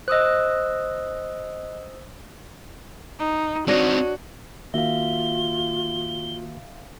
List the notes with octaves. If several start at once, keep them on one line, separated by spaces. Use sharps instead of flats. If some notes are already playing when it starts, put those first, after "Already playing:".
C5 D#5 D#6 E6 F#6
D#4
C4 D4 D#4 F#4 C#5 D#5
D#3 A#3 F4 F#4 E5 F5 G7